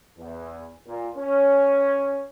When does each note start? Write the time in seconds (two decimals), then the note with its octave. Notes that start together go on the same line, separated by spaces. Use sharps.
0.18 E2
0.86 A#2
1.17 C#4